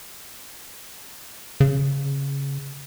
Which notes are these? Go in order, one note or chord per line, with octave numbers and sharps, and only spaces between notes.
C#3